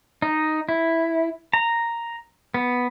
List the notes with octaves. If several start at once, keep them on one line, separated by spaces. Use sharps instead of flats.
D#4
E4
A#5
B3